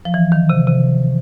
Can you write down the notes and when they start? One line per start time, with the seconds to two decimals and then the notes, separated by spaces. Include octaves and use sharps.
0.05 F3
0.14 E3
0.32 D#3
0.49 C3
0.67 C3